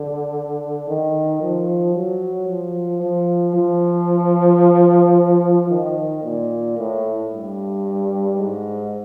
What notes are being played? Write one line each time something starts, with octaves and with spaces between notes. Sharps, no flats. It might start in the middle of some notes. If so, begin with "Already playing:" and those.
Already playing: D3
D#3
F3
F#3
F3
F3
F3
D#3
A#2
A2
G2
G#2